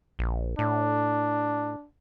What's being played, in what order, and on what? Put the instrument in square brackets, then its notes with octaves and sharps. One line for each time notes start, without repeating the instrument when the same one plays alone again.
[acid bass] A#1
[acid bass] A2 [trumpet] D4